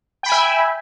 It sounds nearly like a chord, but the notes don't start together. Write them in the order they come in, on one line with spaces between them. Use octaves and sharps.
G5 B5 G#5 E5